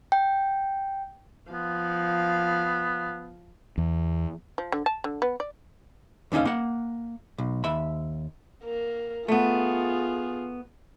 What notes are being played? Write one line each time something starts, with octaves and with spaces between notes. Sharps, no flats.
G5
F3 B3 F5
E2
F3
D3
A5
D3
B3
D5
D#2 D3 C#4 D#4 F5
A#3 F#5
B1
D#2 E5 B5
A#3 A#4
A3 B3 F4 G#4